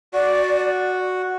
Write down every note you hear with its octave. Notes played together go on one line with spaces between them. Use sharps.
F#4 D5